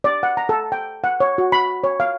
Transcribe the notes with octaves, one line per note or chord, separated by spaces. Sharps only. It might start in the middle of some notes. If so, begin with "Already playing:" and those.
D5
F#5
A#5
A4
G5
F#5
C#5
F#4
B5
C#5
F5